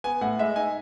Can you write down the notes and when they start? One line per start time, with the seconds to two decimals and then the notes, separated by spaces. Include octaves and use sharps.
0.04 B3 G#5
0.21 A2 F#5
0.39 G#3 E5
0.56 D#4 G#5